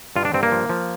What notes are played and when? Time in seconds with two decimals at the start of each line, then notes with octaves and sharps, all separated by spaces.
0.16 G2 F4
0.25 D4
0.34 G2 C4
0.43 A#3
0.52 F3
0.69 F3